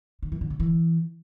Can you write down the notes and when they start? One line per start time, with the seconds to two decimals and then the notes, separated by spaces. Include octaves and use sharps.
0.22 D3
0.32 E3
0.41 D3
0.50 C#3
0.60 E3